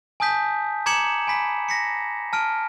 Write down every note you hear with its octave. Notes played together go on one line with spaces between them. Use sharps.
G#5 A5 D#6 G6 B6
A#5 D6 G#6 C#7 E7 F#7
G#5 B5 B6
A#6 B6 C#7
A5 F6 D7